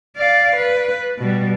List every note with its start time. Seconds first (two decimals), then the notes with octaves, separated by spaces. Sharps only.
0.17 D5 F5
0.57 B4
1.19 B2 G3